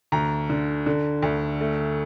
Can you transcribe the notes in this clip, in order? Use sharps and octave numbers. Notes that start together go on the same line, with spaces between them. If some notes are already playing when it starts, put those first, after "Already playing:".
D2 A#5
D3
D3
D2
A3